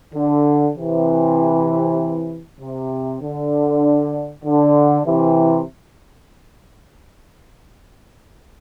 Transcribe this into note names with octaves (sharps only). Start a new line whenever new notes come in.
D3
C3 E3
C3
D3
D3
C3 E3